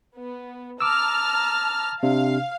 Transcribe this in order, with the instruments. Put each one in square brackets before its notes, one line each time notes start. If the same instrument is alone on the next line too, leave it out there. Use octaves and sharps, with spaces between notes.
[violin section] B3
[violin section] A5 A#5 F6 [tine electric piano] D6 E6
[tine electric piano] C3 D4 [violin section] F5